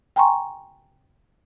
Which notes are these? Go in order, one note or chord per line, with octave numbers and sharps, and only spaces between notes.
G5 G#5 A#5 C6 C#6